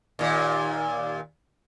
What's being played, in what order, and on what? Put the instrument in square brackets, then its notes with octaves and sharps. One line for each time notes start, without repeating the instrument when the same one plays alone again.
[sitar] D#2 A#2